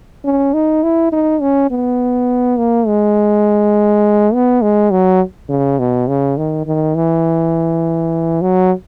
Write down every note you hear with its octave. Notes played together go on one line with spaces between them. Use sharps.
C#4
D#4
E4
D#4
C#4
B3
A#3
G#3
B3
G#3
F#3
C#3
B2
C#3
D#3
D#3
E3
F#3